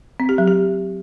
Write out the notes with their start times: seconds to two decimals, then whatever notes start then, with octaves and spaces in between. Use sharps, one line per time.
0.20 C4
0.29 G4
0.38 F#3
0.48 G4